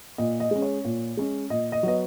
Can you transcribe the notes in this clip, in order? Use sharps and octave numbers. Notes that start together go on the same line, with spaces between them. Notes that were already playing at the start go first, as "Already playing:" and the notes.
A#2 D#5
D#5
G#3 C#4
C#5
A#2
G#3 C#4
A#2 D#5
D#5
F#3 B3 D#5